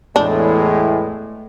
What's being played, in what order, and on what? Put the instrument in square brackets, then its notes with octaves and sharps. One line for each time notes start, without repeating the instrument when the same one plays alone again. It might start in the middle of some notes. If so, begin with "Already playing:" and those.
[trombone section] E2 A2 [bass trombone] G#3 [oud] A3 [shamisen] D4